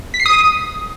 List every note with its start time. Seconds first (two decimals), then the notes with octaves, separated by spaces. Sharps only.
0.14 B6
0.20 C7
0.26 D#6